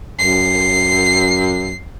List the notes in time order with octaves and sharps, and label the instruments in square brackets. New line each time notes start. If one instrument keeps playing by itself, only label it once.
[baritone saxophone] F#2 [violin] C7